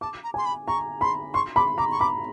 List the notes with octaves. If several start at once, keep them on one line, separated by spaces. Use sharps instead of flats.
A5 D6
A#5
G#5 C6
B5
A#5 C#6
B5 C6
C6 C#6
B5 D6
A#5 D6
C#6
B5 D6